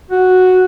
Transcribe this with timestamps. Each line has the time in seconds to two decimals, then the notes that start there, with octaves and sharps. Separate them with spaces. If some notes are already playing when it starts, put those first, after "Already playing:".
0.11 F#4